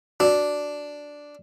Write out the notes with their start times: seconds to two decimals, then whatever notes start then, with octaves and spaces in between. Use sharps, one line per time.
0.20 D4 F#4 D5